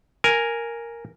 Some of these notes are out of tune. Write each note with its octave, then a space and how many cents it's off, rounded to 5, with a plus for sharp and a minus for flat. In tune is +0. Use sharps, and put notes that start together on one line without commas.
A#4 +0 G#5 +0